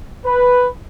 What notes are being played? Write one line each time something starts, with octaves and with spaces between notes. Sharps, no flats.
B4